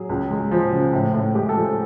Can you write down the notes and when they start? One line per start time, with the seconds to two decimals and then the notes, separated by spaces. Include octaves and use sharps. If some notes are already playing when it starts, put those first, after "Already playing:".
Already playing: F#3 G#4
0.09 C#2
0.30 G#3
0.52 F3
0.72 C#3
0.93 A2
1.14 A2
1.35 G#3 G4
1.49 A4
1.56 F3